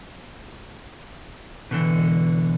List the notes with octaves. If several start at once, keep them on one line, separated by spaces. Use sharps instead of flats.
B2 D3 E3